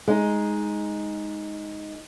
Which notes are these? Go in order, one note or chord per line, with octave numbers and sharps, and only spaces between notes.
G#3 D#4